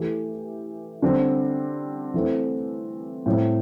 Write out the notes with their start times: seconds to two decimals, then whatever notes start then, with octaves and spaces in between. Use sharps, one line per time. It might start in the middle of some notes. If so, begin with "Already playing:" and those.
Already playing: E3 A3 E4 G4
1.02 D3 G3 C4
2.14 E3 A3 C4
3.26 A2 G3 C4